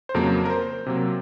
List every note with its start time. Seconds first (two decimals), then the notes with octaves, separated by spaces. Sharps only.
0.09 C5
0.14 F2 C#3 F#3 A#3 A#4
0.45 A#4
0.50 C5
0.86 C3 F#3 A#3